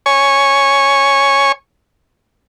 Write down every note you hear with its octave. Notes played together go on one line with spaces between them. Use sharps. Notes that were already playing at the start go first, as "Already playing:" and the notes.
C#5 G#5 C#6